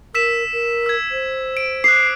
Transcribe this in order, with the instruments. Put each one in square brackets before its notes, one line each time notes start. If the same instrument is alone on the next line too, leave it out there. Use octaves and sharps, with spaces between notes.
[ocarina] A#4 [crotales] E6 B6 E7
[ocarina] A#4
[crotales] E6 G#6
[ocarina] C5
[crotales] D7
[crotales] D6 D#6 F#6 [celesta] C7